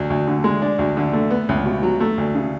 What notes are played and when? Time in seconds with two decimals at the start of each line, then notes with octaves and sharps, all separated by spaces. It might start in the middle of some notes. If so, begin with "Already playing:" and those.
Already playing: D2 F#3
0.10 D2
0.28 D3
0.44 G#3
0.62 D4
0.79 D2
0.97 D3
1.13 A3
1.30 B3
1.49 C#2
1.66 B2
1.83 F#3
2.00 A3
2.18 D2
2.35 C#3